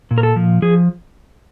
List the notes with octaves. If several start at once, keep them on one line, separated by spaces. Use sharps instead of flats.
A#2
A#4
A4
F3
F3 G#4